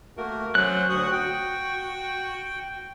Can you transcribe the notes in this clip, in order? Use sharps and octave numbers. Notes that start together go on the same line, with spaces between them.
A3 A#3 F#4 A#4
F#3 C#4 C5 F#6
D2 F#4 C#6 D#6
F#4 G5